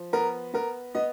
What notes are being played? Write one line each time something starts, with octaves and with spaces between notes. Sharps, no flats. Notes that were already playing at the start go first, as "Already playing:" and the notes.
Already playing: F3
B3 A#4
B3 A#4
B3 D#5